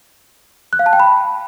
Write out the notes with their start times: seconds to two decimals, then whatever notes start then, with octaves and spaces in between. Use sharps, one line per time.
0.73 F#6
0.79 F5
0.86 A5
0.93 G5
1.00 B5